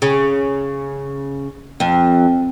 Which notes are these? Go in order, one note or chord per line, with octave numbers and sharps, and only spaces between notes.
C#3
F2